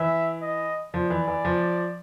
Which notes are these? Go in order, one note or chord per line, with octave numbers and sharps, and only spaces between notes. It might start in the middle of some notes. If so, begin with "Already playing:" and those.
Already playing: E3 E5
D#5
F3 D5
E3
E3
F3